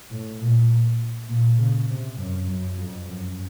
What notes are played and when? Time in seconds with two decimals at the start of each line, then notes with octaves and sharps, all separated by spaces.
0.11 A2
0.40 A#2
1.29 A#2
1.58 C#3
1.89 C3
2.17 F#2
2.48 F#2
2.77 F2
3.06 F#2